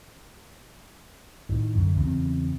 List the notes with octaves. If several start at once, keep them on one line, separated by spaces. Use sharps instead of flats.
A2 D#3
F#2 D3
E2 C#3 E3 C4